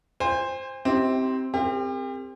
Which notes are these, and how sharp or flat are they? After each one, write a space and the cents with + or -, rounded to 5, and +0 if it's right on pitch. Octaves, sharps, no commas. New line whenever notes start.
C5 +0 G#5 -45
C4 +0 E4 -45 G4 -20
C4 +0 G4 +35 A#4 -30